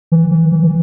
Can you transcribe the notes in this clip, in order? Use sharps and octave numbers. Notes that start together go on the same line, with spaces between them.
E3
E3
E3
E3